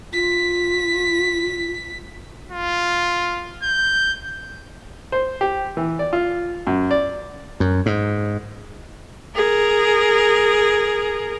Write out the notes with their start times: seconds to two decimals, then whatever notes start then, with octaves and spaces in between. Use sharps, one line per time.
0.13 F4 B6
2.50 F4
3.63 G6
5.12 C5
5.41 G4
5.77 E3
5.99 D5
6.13 F4
6.67 F#2
6.91 D5
7.60 F#2
7.86 G#2
9.35 G#4 A#4